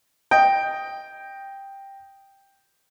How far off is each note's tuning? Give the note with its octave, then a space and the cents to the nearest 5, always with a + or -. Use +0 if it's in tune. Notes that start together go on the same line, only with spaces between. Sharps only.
D#5 +0 G5 +5